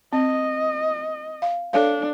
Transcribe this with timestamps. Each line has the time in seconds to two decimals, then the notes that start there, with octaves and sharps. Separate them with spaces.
0.13 C4 D#5
1.42 F5
1.73 D4 A4 C#5 F5